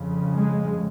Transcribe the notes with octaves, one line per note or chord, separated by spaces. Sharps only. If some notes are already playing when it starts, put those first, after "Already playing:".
Already playing: F2 C#3
G#3